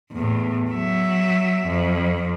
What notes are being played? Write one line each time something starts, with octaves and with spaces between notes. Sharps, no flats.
E2 A2
F#3 E5
F2